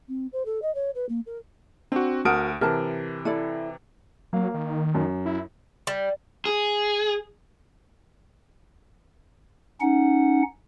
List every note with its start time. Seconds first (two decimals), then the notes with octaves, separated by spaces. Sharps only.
0.08 C4
0.32 C5
0.45 A4
0.62 D#5
0.74 C#5
0.94 B4
1.09 A#3
1.26 A#4
1.92 C4 D4 F#4
2.25 D2 F#4 A#4 A5 D#6 D7
2.61 C3 E3 A#4 A5
3.25 E4 A4 D5
4.33 F#3 A#3 F5
4.54 D#3
4.95 F#2
5.26 E4
5.87 G3
6.45 G#4
9.81 C#4 D#4 F#5